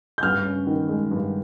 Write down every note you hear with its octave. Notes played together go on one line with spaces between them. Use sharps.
G6
G2 F6
C#4
D#3
G#3
G2